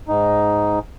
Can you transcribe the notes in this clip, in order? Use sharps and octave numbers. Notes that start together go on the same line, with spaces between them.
G#2 D#4